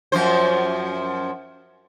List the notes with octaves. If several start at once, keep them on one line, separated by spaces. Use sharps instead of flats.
F#2 F3 C5